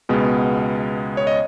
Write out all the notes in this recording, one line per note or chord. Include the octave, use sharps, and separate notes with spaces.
C#2 B2 G#3 B3
C#5
D#5